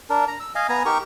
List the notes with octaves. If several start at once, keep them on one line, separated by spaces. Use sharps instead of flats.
D4 A#4
A#5
E6
D#5 F5 G#5
B3 G#5 A#5
D#4 G4 A#4 C#6